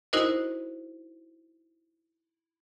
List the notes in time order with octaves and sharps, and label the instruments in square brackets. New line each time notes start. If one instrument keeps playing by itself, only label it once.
[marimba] D#4 E4 F#4 A#4 C5 D#5